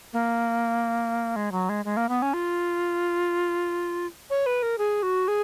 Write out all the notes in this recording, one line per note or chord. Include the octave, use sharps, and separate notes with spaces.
A#3
G#3
F#3
G#3
G#3
A#3
B3
C#4
F4
C#5
B4
A#4
G#4
F#4
G#4